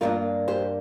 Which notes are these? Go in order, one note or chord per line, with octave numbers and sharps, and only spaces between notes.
G2 G3 A#3 D4 F4 A#4
G4 C5